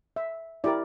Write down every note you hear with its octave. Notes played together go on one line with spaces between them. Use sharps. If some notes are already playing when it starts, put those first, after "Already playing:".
E5
E4 G4 A#4 D5